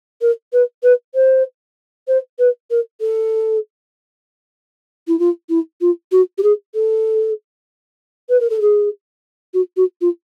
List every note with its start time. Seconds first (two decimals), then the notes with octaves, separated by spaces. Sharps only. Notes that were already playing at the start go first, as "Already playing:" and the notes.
0.21 A#4
0.53 B4
0.83 B4
1.15 C5
2.08 C5
2.39 B4
2.70 A#4
3.01 A4
5.08 E4
5.19 F4
5.49 E4
5.81 F4
6.12 F#4
6.38 G4
6.43 G#4
6.75 A4
8.29 B4
8.40 A#4
8.50 A4
8.61 G#4
9.54 F#4
9.77 F#4
10.01 F4